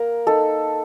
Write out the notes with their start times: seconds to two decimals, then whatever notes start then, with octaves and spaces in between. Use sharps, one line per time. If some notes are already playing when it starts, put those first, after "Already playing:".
Already playing: A#3 A#4
0.27 D#4 A4